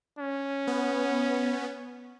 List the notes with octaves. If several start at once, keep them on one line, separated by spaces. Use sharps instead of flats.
C#4
B3